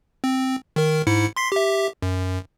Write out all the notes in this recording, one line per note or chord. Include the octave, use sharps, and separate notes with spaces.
C4
D#3 A#4
G#2 E4 C#7
C6 B6 C7
G4 E5
F#2